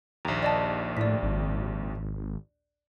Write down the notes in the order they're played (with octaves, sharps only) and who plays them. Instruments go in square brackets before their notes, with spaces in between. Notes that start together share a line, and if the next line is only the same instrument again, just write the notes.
[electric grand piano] A#1 D#2 [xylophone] A#5
[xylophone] D5 D#5 A5
[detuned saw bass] A2 [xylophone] D5 B6
[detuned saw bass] G#1